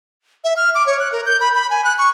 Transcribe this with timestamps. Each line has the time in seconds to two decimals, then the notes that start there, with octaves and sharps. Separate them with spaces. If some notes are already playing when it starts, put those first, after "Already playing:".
0.44 E5
0.57 F6
0.75 D6
0.87 C#5
1.00 F#6
1.12 A#4
1.26 G6
1.41 B5
1.55 B5
1.70 G#5
1.84 F#6
1.98 C#6